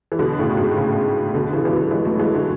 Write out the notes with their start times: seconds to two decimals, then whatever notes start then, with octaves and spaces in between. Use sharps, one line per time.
0.12 E3
0.19 B2 D3
0.39 A2 C#3
0.57 G#2 B2
0.77 A2 C#3
1.33 B2 D3
1.53 C#3 E3
1.65 E3
1.72 D3 F#3
1.91 E3 G#3
2.05 F#3 A3
2.19 E3 G#3
2.35 D3 F#3